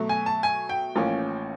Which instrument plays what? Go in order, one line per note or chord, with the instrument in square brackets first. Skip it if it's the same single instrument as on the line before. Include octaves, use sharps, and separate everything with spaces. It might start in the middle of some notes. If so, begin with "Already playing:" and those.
Already playing: [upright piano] B2 F#3 A3
[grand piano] G#5
A5
G#5
G5
[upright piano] A1 A2 F3 A#3 C#4